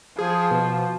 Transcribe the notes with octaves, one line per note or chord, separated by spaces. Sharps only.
F3 G#4
B2